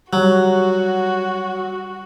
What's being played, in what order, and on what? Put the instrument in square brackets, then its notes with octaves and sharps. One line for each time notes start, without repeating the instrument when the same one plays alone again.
[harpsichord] F#3 [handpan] G3 [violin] F#4